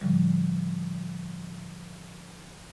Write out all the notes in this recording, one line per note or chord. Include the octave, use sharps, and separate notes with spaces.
A2 D3 F3 G3